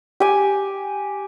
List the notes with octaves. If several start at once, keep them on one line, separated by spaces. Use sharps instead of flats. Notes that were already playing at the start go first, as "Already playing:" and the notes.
G4 G#5